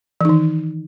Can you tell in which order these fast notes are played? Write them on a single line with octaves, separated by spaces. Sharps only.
E3 D#4 D#3